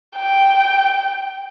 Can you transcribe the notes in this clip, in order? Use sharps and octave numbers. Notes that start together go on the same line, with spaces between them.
G5